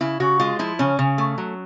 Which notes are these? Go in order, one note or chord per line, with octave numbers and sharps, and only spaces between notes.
C#3 E4
C#3 F#4
G#3 F4
F3 E4
C#3 C#4
C#3
A3
F#3